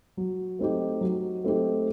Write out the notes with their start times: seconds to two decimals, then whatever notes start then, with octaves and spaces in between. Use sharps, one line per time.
0.17 F#3
0.59 A3 C4 D#4 G4
1.01 F#3
1.44 A3 C4 D#4 G4